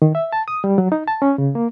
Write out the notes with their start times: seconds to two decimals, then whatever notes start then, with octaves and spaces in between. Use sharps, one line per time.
0.02 D#3
0.15 E5
0.33 A5
0.48 D#6
0.64 G3
0.78 F#3
0.92 D#4
1.08 A5
1.22 C#4
1.38 C#3
1.55 A#3